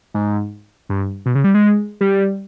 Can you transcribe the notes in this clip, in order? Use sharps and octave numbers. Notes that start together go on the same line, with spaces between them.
G#2
G2
B2
C#3
G3
G#3
G3